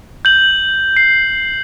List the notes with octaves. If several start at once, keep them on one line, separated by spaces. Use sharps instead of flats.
G6 F#7
C7